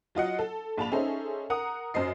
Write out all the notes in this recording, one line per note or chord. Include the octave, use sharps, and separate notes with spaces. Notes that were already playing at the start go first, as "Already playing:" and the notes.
F#3 F4 D#5 F#5
A4
A#1 A5 B5 F7
C#4 D#4 G#4 A4 C5 E5
A#4 F#5 A#5 D#6
F#2 F#3 C5 D#5 C7